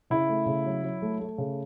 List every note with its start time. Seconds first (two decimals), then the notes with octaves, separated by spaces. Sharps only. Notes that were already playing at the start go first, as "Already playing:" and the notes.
0.10 C#3 E4
0.29 A3
0.46 C#3
0.65 F#3
0.84 F#3
1.02 A3
1.20 A3
1.38 C#3